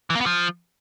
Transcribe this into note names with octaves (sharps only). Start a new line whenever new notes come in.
E3
A#3
B3
F3